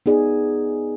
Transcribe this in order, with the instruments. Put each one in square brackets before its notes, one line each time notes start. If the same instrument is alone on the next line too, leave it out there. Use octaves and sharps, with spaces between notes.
[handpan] B3 D#4 G#4 D5 D#5